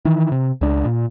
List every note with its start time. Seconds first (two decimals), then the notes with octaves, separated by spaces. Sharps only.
0.05 D#3 E3
0.32 C3
0.61 C#2 D4
0.86 A#2